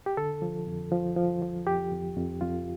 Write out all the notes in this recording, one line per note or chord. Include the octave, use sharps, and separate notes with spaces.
G4
D3 A4
F3
F2
F3
F3
F3
F2 G4
F2
F2
F2 F4